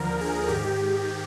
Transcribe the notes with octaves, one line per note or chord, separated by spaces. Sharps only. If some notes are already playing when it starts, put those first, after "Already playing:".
Already playing: D#2 D3 F3 A#4
G#4
G#2 D#3 G4
G4